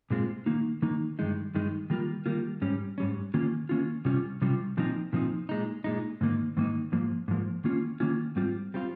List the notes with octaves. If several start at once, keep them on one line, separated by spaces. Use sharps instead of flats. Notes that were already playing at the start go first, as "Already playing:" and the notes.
A#2 G#3 C4 F4
D#3 A#3 D#4
D#3 A#3 D#4
G2 D#3 G#3 D#4
G2 D#3 G#3 D#4
D#3 G3 A#3 F4
D#3 G3 A#3 F4
G#2 G3 C#4
G#2 G3 C#4
D#3 A#3 C#4 F4
D#3 A#3 C#4 F4
C3 G3 C#4 F4
C3 G3 C#4 F4
A#2 F3 C4 D#4
A#2 F3 C4 D#4
A#2 G#3 D#4
A#2 G#3 D#4
G#2 D#3 A#3 D#4
G#2 D#3 A#3 D#4
G#2 F3 A#3
G#2 F3 A#3
D#3 A#3 C#4 F4
D#3 A#3 C#4 F4
G#2 G3 C4 F4
G3 C4 F4